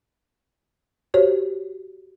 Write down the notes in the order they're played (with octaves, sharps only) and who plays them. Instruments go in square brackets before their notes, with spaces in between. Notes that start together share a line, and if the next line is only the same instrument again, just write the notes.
[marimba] F#4 G4 C5 C#5